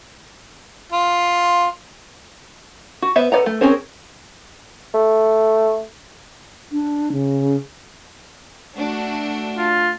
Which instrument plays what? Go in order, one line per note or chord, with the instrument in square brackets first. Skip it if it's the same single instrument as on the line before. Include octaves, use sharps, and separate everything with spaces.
[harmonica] F4
[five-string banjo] F#4
B3 B4 C5 E5
A4 B4 D5 F#5 A#5
A3
C4 C#4 G#4 A#4 C5
[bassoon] A3
[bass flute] D4
C#3
[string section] A3 D4 F#4
[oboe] F4